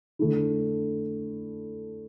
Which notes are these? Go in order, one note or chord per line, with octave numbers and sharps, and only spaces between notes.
D3 A3 E4